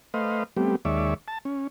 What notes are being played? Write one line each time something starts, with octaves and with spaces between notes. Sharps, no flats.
A3 B4 C5 D#5 F5
G3 A3 B3 C4 G4
D#2 G#3 C#5 D5 E5
A5
C#4